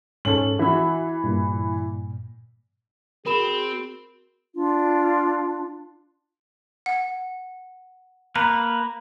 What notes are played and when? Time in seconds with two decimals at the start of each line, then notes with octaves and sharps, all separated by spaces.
0.25 G#2 C#4 A4 F#7
0.59 E3 F#4 E5
1.24 G2 A#2
3.26 C4 F#4 G#4 A#4 B5 E7
4.54 D4 F4
6.86 F#5
8.36 A#3 A#4 B4 A#5